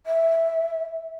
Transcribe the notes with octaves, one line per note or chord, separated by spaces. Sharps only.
E5